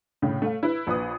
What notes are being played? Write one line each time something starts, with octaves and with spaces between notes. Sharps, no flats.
A2 C#3
A3 F5
E4 B4
A#1 B4 D#6